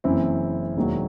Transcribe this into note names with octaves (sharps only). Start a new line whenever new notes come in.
F#1 F#2 E3 C4 E4
E1 D#2 D#3 F#3